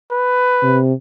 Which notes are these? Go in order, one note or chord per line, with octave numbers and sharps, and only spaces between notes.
B4
C3